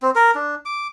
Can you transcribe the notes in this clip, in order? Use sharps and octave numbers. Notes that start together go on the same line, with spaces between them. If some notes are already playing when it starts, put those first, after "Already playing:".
C4
A#4
D4
D6